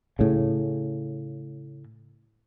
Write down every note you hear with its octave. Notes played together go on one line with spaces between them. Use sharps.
A2 C#3